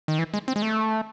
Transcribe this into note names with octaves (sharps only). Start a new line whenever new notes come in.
D#3
E3
G#3
C4
G#3
A3